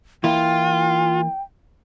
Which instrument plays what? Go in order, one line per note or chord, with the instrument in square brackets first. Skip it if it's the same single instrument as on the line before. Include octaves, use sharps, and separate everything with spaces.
[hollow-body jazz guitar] E3 A#3 E4 [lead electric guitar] F4 [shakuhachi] G5